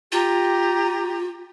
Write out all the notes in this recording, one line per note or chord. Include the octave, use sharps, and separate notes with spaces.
F4 G4 A#5